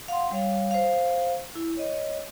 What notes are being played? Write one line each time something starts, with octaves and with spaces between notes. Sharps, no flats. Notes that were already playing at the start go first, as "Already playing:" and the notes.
F5 F#5 C6
G3 C#5 F5
C5 F5
E4
C#5 D#5